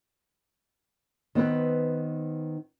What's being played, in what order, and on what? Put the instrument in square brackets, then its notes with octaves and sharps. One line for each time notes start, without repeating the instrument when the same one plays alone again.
[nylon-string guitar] D#3 B3 C4 B4